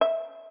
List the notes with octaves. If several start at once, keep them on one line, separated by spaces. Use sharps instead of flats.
E5